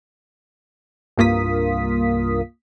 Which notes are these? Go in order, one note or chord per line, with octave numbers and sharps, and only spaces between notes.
C2 G2 A#3 F4 D#6 B6